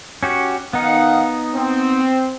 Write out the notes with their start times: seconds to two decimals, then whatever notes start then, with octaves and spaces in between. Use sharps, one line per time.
0.23 C#4 F#4 G4
0.73 D#3 B3 D#4 F5 F#5
1.56 C4